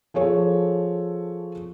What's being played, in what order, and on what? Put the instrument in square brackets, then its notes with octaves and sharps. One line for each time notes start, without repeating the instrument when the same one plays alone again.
[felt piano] F3 G#4 A4 C#5